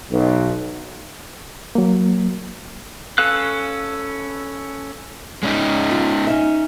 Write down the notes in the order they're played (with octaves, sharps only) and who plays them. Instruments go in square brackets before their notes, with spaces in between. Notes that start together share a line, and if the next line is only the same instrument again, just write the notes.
[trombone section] B1
[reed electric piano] F#3 A#3
[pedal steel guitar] C#4 A4 B4 F5 F#6
[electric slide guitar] G#3 C#4 D#4
[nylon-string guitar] F4
C#4 D#4 E5